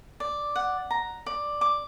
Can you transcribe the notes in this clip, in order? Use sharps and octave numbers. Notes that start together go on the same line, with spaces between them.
D5
F#5
A#5
D5
D6